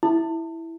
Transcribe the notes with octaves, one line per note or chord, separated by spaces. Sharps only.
E4